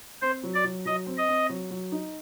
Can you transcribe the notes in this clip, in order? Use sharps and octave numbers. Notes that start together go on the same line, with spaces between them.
C4 C5
F#3
D5
F#3
F#3 D#5
C4
D#5
C4
F#3
F#3
D#4